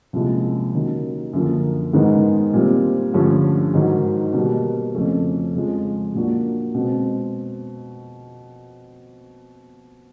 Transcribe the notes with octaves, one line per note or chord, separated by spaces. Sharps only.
C2 A#2 F3 G#3 C#4
D#3 F#3 A#3 C#4
F#2 D3 F3 A#3
G#2 D#3 G#3 B3 D#4
A#2 G3 C4
G2 D3 F3 A3 C#4
G#2 D#3 F#3
B2 G3 A#3
F2 C#3 F3 A3 C#4
F2 C#3 F3 G#3
A#2 F#3 A#3 D4 F#4
B2 G#3 C4